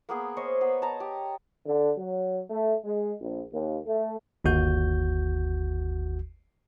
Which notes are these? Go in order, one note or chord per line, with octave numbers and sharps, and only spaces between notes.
A#3 B3 G#4 B4
C5 C#5 D#5
B3 B4
A5 A#5
G4
D3
F#3
A3
G#3
A#1
D#2
A3
G1 D#2 F#4 G6